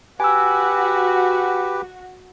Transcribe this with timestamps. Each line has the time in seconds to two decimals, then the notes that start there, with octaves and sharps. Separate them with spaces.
0.20 F#4 G4 B4 G#5 E6